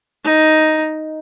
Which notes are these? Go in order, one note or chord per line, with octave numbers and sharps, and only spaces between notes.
D#4